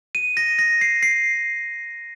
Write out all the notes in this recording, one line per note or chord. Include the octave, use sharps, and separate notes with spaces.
D#7
A#6
A#6
C7
C7